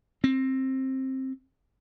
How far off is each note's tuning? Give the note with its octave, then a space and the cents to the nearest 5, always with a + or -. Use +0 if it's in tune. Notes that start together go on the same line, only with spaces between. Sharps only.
C4 +15